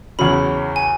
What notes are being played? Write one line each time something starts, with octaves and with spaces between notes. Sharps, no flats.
E2 C#3 F#3 C#4 B5
G#5